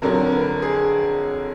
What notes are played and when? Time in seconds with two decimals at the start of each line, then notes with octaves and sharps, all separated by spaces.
0.02 F2 D3 F#3 A#4
0.26 A#4
0.32 B4
0.62 G#4